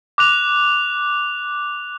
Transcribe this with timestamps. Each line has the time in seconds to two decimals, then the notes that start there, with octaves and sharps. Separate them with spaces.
0.18 D6 F#6 F7